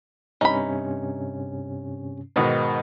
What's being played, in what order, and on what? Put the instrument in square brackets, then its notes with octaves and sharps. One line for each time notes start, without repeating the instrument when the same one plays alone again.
[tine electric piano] G2 C3 C#4 [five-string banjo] D#4 B5
[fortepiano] G#2 B2 D#3